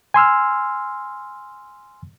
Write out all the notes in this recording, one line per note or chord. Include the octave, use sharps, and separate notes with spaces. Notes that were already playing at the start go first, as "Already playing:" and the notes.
G#5 C6 E6 F6